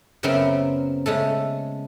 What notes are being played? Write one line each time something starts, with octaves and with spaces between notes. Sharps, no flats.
F#2 C#3 B3 C4 A#4 E5
C#3 G#3 A3 A4